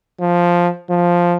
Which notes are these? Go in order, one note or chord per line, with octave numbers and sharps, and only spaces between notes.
F3
F3